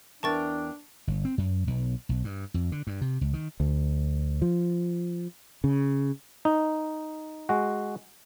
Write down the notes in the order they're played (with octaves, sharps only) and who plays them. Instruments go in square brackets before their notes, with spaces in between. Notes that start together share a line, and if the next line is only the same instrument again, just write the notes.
[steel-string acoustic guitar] E2 A#4 G5 [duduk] D4 [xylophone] A5 C#6 A6
[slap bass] G1
C4
F#2
B1
B1
G2
F2
D3
G2
C3
C#2
D#3
[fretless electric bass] D2
F3
C#3
[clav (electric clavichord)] D#4
G#3 F#4